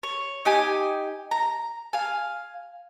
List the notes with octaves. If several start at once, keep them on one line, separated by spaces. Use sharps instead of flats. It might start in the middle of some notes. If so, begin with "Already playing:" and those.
C#5
D#4 G4 G#5
A#5
F5 G#5